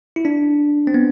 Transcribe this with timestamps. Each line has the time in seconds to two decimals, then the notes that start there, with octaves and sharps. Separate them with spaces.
0.16 E4
0.25 D4
0.87 C4
0.94 B3